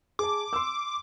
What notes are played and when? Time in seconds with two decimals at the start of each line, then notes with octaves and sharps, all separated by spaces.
0.19 G#4 A5 D6
0.53 C6 E6